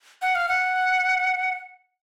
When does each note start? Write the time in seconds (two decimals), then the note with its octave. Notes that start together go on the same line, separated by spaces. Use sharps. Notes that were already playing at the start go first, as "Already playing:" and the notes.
0.22 F#5
0.35 F5
0.49 F#5